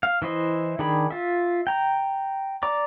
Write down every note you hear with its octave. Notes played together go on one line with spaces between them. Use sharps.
F5
E3 E4 C5 D#5
D#3 D4 G#4 B5
F4 E5
G5 A#5
D5 A#5 D6